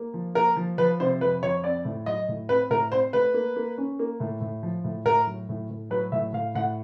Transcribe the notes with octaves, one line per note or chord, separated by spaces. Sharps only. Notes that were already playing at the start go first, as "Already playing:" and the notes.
Already playing: A#3
F3
A#3 A#4
F3
F3 B4
C3 C5
F2 B4
F2 C#5
C4 D5
A2
F#3 D#5
A2
C4 B4
A2 A#4
C4 C5
A3 B4
A#3
A#3
C#4
A#3
A2
A2
F3
A2
A2 A#4
F#3
A2
A2
F#3 B4
A2 E5
A2 F5
A2 F#5